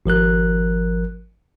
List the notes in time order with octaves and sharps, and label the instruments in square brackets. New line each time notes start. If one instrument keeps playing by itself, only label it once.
[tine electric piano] G#1 F3 A#4 F#6